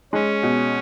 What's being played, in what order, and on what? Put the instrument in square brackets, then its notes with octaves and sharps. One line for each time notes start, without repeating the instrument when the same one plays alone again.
[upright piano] G#3 [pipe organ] C#4
[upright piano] B2